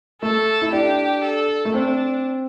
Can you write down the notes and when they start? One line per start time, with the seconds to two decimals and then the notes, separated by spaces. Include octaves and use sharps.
0.22 A3 A4
0.62 E4
0.73 D4 G4
1.24 A4
1.65 A3
1.74 C4 D4